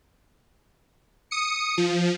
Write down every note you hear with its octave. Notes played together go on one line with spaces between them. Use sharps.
D#6 C#7
F3